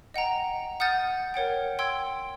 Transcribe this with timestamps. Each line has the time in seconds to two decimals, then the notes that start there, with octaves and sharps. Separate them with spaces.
0.14 D#5 F#5 G5 A#5
0.80 F#5 D#6 F6 G6 A6 D#7
1.34 A#4 C#5 F#5 G5
1.79 G5 C6 E6 G#6